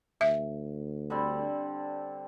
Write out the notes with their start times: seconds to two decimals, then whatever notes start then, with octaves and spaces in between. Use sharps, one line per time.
0.21 D2 E5
1.10 D3 G3 C4